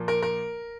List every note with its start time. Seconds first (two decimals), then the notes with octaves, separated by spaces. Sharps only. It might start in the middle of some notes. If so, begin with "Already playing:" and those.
Already playing: A#2 F3 A#3
0.08 A#4
0.22 A#4